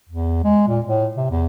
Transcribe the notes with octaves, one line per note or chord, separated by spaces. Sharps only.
E2
G#3
A#2
A2
C3
E2